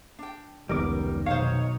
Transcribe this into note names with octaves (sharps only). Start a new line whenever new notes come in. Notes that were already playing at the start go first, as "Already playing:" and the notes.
D4 G5
F1 C#2 D#3 G3 B3 A#4 D6
B1 D#4 C5 C#5 F5